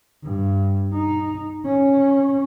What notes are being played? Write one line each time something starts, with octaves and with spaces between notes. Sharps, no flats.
G2
D#4
C#4